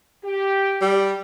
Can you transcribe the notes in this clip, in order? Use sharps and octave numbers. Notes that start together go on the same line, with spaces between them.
G4
G3